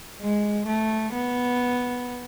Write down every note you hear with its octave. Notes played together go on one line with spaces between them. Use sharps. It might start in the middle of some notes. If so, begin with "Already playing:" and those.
G#3
A3
B3